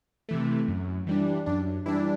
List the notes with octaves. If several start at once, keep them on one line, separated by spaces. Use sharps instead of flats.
C3 E3 A3
F#2
E3 G3 D4
F#2 D4
E3 G3 D4 E4